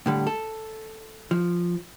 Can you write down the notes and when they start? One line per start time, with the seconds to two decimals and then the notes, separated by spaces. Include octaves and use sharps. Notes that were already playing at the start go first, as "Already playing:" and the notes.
0.06 A2 D3 G3
0.27 A4
1.31 F3